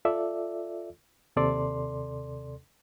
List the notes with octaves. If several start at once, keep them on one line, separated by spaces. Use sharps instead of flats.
F4 A4 D5 E5
D#2 C3 A4 D5 C6